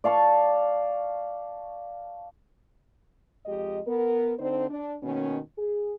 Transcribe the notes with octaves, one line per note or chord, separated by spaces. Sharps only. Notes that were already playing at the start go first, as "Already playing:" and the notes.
D5 F5 A5 C#6
F2 G#3 G4 D#5
B3 A#4
D3 C4 D4 D#4 C5
D4
B2 D#3 A#3 C#4
G#4